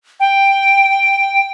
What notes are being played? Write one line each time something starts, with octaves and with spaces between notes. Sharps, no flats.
G5